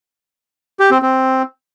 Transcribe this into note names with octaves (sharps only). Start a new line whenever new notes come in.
G4
C4
C4